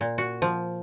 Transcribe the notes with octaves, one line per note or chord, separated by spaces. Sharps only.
A#2
F#4
F3